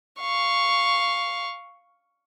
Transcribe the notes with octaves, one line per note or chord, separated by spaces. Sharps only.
F5 C#6